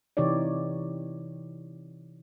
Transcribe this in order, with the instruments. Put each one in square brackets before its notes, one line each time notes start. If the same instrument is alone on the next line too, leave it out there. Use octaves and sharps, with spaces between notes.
[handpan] C3 E3 D#4 G4 C#5 D5